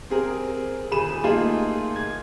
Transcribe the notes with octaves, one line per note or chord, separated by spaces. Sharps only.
C4 G#4 A#4
D#1 G#4 B5 D#7 E7
A3 A#3 D#4 F4 G#4
G#6